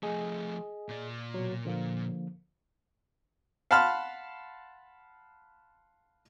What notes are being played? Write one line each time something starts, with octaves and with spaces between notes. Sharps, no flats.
F3 A3 G#4 D#5 G#5
A#2 D5
B2 F#3
D3 F3 A#3
F5 F#5 A5 B5 C6 F6